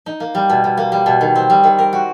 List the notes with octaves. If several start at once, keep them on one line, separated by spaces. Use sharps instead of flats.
D#4
A#3
G3
B2
B2
A#3
G3
B2
D#3
C4
G3
D#3
A#4
F#4